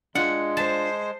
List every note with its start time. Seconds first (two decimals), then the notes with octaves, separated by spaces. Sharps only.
0.15 G#3 D4 F4 F#5
0.57 C5 A5